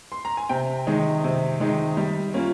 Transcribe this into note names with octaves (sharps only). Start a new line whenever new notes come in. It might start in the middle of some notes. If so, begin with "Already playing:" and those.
C6
A#5
G#5
C3 G5
D#3 G#3 D#4
C3
D#3 G#3 D#4
G3
A#3 C#4 F4